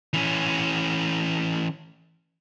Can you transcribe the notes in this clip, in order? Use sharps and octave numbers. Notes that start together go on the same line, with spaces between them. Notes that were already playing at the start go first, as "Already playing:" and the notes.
E3 C#4